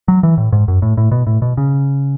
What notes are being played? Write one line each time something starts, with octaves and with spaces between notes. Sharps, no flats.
F#3
E3
A2
G#2
F#2
A2
A2
B2
A2
B2
C#3